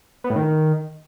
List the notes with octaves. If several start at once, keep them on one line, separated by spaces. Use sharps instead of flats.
B3
A2
D#3